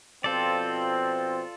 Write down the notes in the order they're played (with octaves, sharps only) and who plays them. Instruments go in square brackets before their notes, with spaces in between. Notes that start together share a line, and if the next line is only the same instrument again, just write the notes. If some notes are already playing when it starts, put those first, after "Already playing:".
[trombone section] B2 F3 C4 [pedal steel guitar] F4 A4 D5